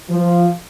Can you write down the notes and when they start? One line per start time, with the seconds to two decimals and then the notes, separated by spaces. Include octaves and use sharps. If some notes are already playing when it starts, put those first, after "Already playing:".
0.10 F3